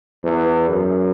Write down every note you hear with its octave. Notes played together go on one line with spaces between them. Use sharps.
E2
F#2